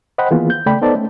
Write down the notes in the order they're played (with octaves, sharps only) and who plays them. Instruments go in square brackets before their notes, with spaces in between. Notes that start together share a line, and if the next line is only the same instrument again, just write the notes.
[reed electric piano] C5 D#5 F#5 G5 B5
D#3 E3 A#3 B3 F4 G#4
G6
C#3 A3 D5 G5 B5
B3 D#4 A4 C5 D5 A5
A3 C#4